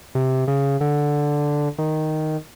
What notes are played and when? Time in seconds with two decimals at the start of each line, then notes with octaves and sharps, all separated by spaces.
0.15 C3
0.48 C#3
0.81 D3
1.78 D#3